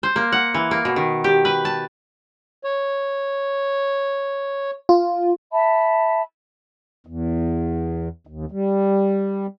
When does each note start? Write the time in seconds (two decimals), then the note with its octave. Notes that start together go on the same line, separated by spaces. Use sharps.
0.03 C5
0.16 A#3
0.32 F#5
0.54 E3
0.71 A#3
0.85 B2
0.96 D#3
1.24 G4
1.45 B4
1.65 A5
2.64 C#5
4.89 F4
5.52 E5 A5 B5
7.07 E2
8.27 D#2
8.51 G3